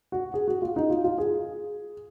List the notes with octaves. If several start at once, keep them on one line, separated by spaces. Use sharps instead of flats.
F#4
G#4
F#4
F4
D#4
F4
F4
G#4